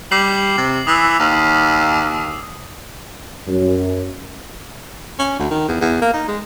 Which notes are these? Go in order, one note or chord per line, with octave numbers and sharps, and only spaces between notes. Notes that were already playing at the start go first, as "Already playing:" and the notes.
G3 D6 C7 F#7
C3
E3 D#6 E6
D#2
F#2
C#4
D2
D#3
E2
E2
A#3
D#4
G#3